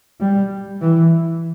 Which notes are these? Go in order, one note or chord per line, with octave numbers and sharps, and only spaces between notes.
G3
E3